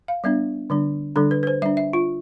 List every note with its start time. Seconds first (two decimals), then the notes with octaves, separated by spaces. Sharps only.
0.08 F5
0.24 G3 B3 D4 E5
0.70 D3 G3 D4
1.16 D3 G3 D4 A4
1.31 B4
1.43 B4
1.47 C5
1.62 G3 D4 E5
1.77 E5
1.93 F4